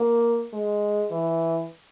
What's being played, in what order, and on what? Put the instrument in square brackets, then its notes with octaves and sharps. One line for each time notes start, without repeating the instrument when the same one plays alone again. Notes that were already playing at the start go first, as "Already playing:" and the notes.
Already playing: [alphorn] A#3
G#3
E3